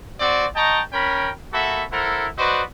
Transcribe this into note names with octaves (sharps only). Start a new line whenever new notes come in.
C4 F#4 D5
D#5 G5 A5 A#5 C#6
C#4 A#4 G5 B5
A#3 F#4 A4 E5 B5
E4 A4 A#4 C5 F#5
F#4 B4 C5 D5 D#5